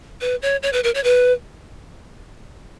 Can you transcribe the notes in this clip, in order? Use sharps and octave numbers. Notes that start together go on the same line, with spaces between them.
B4
C#5
C#5
B4
A#4
C#5
B4